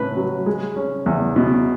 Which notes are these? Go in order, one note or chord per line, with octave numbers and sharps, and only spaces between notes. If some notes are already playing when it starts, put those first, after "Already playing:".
Already playing: A2 C#4 B4
F#3
G#3
C#4
E2
B2